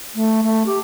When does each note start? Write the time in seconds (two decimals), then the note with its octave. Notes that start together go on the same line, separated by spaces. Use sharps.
0.15 A3
0.43 A3
0.66 G4